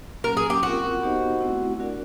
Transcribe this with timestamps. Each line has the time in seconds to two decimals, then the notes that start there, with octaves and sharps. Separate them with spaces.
0.24 F#3 A#3 C#4 A#4
0.37 G#4
0.50 G4
0.63 C4 F4 F#4 A#4
1.02 B3 D#4 G4 C5 D#5
1.41 A3 C4 E4
1.80 D4 F#4 A#4 D5 F#5